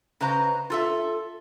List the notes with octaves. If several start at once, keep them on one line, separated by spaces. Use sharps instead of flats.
C#3 B4 C5 D#5 A#5
F4 A4 E5